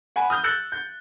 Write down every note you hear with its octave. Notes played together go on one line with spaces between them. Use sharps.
F#5 G#5 B5
D#6 F6 G6
E6 F#6 G6 A6 C#7 F#7
G6